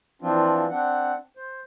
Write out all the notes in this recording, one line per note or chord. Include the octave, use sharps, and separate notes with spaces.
E3 F3 C4 D4 F4
C4 D4 F#5
C5